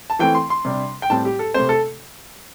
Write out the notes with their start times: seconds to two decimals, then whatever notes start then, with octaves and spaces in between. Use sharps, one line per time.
0.10 A5
0.19 E3 A3 C4 G5
0.35 C6
0.50 C6
0.65 C3 G3 D4
1.02 G5
1.10 A2 G3 C4 A5
1.25 G4
1.39 A4
1.54 C3 A3 C4 C5
1.69 A4